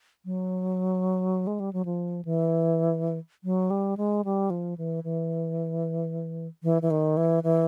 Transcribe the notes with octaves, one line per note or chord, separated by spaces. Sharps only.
F#3
G#3
G3
F#3
F3
E3
F#3
G3
G#3
G3
F3
E3
E3
E3
E3
D#3
E3
E3